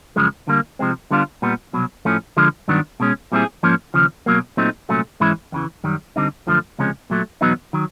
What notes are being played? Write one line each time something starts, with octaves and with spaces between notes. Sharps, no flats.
F#2 C#3 F3 G#3
D3 G3 A#3
C3 F3 G#3 C4
D3 G3 B3 D4 F4
A#2 G3 B3
C2 B2 F#3
A2 F3 A3 C#4
D3 F3 G#3
G2 D#3 F#3 B3 D4
B2 G#3 C#4
A#2 G3 C4 E4 G#4
G#2 F3 A#3 C#4
D#2 C#3 F3
B2 F#3 A#3
A#2 F#3 A3 C4 D#4
C2 A#2 F#3 A3 C#4
G#2 E3 G#3 C#4 E4
E2 C#3 E3
F#2 D#3 G3
D3 G3 C4 D#4
F#2 D3 F3 A3
C#2 C3 F3 G#3 C#4
A#2 F#3 A3
E2 B2 F#3 B3 D#4
D#3 F#3